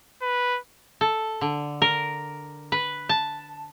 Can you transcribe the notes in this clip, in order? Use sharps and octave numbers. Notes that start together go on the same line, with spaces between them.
B4
A4
D3
A#4
B4
A5